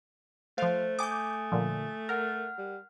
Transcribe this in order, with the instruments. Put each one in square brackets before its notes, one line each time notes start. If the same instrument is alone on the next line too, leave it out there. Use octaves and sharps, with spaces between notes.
[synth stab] F3 F5 [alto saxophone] A3 [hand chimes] C5
[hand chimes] G#5 D#6 [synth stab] D6 G6
[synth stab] A#2 D3 F3
[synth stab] A#4 [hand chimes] F#5 F6
[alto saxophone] G3